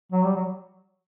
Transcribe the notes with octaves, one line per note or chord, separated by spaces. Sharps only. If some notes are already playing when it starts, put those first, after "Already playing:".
F#3
G3
F#3